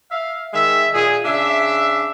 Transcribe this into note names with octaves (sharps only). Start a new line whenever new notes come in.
E5 F5
D#3 G#3 E5
A#2 G#4
C#3 D4 E5